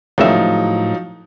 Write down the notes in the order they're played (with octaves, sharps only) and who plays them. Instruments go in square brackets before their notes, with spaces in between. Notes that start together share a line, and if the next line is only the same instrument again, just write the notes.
[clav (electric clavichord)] G#1 C#3 E5 [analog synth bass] A2 [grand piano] F3 F#3 D#4